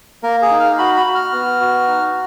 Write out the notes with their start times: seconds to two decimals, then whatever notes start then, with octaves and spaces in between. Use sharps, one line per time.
0.23 A#3 A#4
0.42 G#4
0.51 D#4
0.59 F5
0.78 F#4 B5
0.96 B5
1.06 F#4
1.15 F6
1.32 B3
1.61 F#4
1.87 D#4